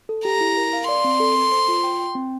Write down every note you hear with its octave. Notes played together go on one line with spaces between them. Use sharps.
A4
G4 A#5
E4
A#4
F5
D5 C6
C4
A4
A4
C5
F4
G5
G5
C4